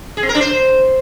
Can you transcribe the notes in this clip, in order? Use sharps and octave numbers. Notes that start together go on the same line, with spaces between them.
G#4
C4
A#4
D4
C5